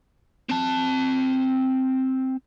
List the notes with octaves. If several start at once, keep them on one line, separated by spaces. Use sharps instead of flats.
C4 A5